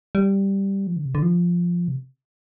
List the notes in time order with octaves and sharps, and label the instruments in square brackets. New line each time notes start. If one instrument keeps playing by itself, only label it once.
[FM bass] G3
F3
D3
C3
D3
F3
C3